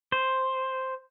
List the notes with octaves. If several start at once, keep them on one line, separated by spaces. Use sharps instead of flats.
C5